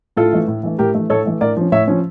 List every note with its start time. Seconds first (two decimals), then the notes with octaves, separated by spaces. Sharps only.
0.17 A2 F4 A4
0.32 E3 A3
0.48 A2
0.63 E3 A3
0.78 A2 G4 A#4
0.95 E3 A3
1.10 A2 A4 C#5
1.25 E3 A3
1.41 A2 A#4 D5
1.57 F3 C#4
1.72 A2 C#5 E5
1.88 F3 C#4